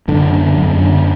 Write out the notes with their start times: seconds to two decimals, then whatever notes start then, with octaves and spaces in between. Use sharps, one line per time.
0.08 F#2 D3
0.33 D3
0.57 F#2
0.82 D3